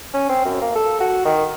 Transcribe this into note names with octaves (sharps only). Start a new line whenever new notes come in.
C#4
C4
F#2
A#3
A4
F#4
D#3